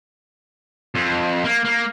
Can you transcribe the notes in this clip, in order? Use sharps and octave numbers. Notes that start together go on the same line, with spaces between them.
F2
A#3
A#3